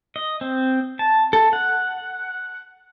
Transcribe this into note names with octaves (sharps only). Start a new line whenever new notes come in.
D#5
C4
A5
A4
F#5